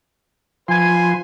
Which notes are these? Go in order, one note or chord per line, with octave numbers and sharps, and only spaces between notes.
F3 B4 G#5 C6